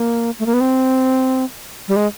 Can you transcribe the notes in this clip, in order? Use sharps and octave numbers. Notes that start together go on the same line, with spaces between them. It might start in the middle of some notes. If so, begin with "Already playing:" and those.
Already playing: A#3
A3
A#3
B3
C4
G3
G#3